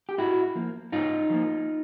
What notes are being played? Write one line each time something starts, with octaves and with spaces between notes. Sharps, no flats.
G4
G#2 E4 F#4
F3 A#3
G#2 D#4 F4
F3 A#3